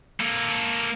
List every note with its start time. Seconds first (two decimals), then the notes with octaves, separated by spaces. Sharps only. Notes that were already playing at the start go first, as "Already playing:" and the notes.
0.20 A#3 A4